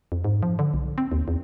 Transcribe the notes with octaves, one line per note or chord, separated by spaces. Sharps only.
F2
G#2
F3
D3
B1
C4
D#2
E2